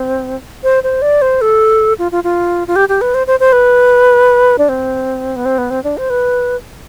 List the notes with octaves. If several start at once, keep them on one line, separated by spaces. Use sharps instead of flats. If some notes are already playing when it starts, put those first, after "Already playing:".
Already playing: C4
C5
C5
D5
C5
A4
F4
F4
F4
F4
G4
G4
B4
C5
C5
C5
B4
D4
C4
B3
C4
B3
C4
D4
C5
B4